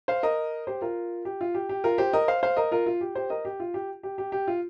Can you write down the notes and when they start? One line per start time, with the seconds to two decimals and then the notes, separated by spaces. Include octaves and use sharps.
0.08 C5 F5
0.23 A#4 D#5
0.67 G4 C5
0.82 F4 A#4
1.25 G4
1.41 F4
1.55 G4
1.69 G4
1.84 F4 A#4
1.98 G4 C5
2.13 A#4 D#5
2.28 C5 F5
2.43 C5 F5
2.57 A#4 D#5
2.72 F4 A#4
2.86 F4
3.01 G4
3.15 G4 C5
3.30 A#4 D#5
3.45 G4
3.60 F4
3.74 G4
4.03 G4
4.18 G4
4.32 G4
4.47 F4